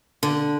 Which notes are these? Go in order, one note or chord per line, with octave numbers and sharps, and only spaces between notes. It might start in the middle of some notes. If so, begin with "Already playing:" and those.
D3